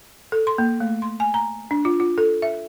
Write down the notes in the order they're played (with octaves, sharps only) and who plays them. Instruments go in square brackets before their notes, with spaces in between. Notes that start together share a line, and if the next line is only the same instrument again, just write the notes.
[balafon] A4
C6
A#3
A3
C6
G#5
A#5
D4
F4
F4
A4
E5